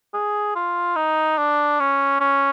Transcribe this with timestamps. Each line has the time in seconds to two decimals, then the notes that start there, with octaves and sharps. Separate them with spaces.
0.14 G#4
0.55 F4
0.96 D#4
1.38 D4
1.80 C#4
2.20 C#4